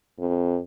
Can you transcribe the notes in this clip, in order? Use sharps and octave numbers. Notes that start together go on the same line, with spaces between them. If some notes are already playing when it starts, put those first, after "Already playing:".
F2